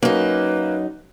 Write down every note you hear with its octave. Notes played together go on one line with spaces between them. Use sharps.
F#2 A#3 D#4 B4